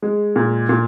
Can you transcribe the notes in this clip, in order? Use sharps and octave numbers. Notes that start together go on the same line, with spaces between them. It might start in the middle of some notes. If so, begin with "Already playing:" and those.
G#3
A#2
A#2